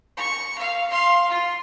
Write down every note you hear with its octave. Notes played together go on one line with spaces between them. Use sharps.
C#6
F5
F5 C6
F4